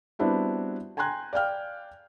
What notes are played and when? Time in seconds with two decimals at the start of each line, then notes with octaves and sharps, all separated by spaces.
0.19 G3 B3 C4 D4 E4 F#4
0.97 G5 G#5 A#5 C6 F#6 G#6
1.33 D5 F5 G5 F6